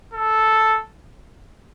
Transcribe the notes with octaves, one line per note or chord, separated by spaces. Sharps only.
A4